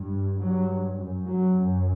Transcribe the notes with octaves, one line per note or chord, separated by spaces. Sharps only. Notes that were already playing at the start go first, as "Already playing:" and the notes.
Already playing: G2
G2 F#3
F#2
F#3
F#2